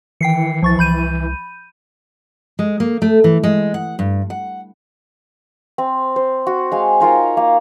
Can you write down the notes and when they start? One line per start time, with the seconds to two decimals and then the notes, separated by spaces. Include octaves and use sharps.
0.21 D#3 E3 G5 C7 C#7
0.62 C2 F3 C#6 A6
0.79 C2 B5 G6 D#7
2.59 G#3
2.80 A#3
3.02 A3
3.24 E3
3.43 G#3
3.74 F#5
3.99 G2
4.30 F#5
5.78 C4
6.16 C5
6.47 F#4
6.72 G#3 F5
7.00 D#4 F4 A#4 C#5
7.37 A#3